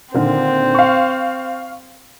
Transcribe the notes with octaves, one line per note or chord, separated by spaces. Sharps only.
A#2 D3 D#3 C4
F5 C#6